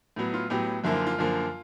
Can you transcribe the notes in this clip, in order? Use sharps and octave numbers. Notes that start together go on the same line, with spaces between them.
A2 F#3 B3
F4
A2 F#3 B3 G4
F#2 D3 F3 A#3 E4
F4
F4
F#2 D3 F3 A#3